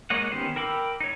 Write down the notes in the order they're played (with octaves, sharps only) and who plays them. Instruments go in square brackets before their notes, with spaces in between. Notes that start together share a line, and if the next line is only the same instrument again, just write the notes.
[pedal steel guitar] G#3 A#3 C#5 D#5 F#5
D#3 B3 C#4 G4 C5
A#4 G5 B5 D6 E6
D#4 C#5